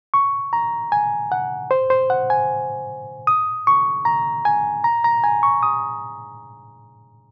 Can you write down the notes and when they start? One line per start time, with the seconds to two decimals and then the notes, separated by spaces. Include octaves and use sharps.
0.14 C#6
0.53 A#5
0.92 G#5
1.32 F#5
1.71 C5
1.90 C5
2.10 F#5
2.30 G#5
3.27 D#6
3.67 C#6
4.05 A#5
4.45 G#5
4.84 A#5
5.04 A#5
5.24 G#5
5.43 C#6
5.63 D#6